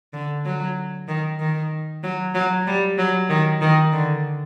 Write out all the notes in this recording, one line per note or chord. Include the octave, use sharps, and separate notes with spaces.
D3
F#3
D#3
D#3
F#3
F#3
G3
F#3
D#3
D#3
D3